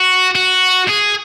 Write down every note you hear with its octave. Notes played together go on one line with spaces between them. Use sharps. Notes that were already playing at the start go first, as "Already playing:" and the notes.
Already playing: F#4
F#4
G#4